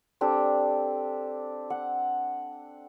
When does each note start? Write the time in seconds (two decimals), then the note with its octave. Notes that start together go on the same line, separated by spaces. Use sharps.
0.21 C4 D4 G4 A4
1.70 F#5